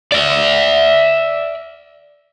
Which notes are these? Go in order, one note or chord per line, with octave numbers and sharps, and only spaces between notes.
D5 E5